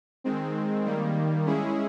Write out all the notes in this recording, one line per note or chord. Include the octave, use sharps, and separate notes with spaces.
D#3 G#3 C4
D#3 G3 A#3
G#3 C#4 E4 G#4